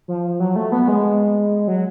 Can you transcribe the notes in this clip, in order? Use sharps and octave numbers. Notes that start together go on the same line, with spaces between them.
F3
F#3
A3
B3
G#3
F#3